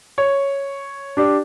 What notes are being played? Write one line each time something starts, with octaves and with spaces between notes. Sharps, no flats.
C#5
D4 G4 D5